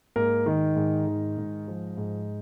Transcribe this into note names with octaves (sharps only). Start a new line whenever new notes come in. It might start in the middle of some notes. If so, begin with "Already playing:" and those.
G#2 A#3 A#4
D#3 D#4
G#2
D#3
G#2
F3
G#2